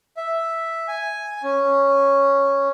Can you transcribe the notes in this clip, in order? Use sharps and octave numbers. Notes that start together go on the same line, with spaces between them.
E5
G#5
C#4